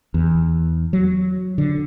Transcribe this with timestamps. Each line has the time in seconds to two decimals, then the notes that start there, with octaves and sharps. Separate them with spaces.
0.14 E2
0.93 F#3
1.58 D3